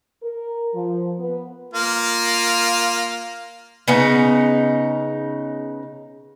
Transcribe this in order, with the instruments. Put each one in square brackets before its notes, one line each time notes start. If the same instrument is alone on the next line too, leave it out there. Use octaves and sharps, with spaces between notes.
[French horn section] A#4
F3
B3
[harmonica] A#3 F4
[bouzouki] C#3 B3 D#4